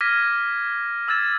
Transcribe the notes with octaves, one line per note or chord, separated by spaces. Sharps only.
D6 F6 G#6 A#6 B6 D#7
D6 E6 G#6 A6 E7